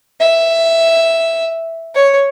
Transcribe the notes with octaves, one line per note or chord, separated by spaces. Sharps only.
E5
C#5